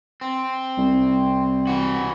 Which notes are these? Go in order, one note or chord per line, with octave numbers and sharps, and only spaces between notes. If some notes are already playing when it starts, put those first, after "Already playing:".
C4
C2
E3 F#4